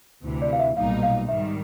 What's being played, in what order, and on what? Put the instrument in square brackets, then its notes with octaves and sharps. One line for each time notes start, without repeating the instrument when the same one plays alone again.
[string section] D2 C3 E3
[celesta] D5
F5
E5
[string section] B1 A#2 G3 A#3 D#4 [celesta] F5
[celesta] F5
[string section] G#2 D#3 G3 [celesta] E5